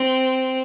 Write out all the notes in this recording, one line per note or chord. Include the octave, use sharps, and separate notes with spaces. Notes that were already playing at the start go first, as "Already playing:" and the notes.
Already playing: C4